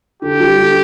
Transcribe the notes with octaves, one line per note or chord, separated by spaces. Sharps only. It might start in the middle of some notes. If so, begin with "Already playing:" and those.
D3 G4
G3
D3